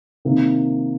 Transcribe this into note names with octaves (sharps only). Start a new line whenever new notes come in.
C3 D#3 A#3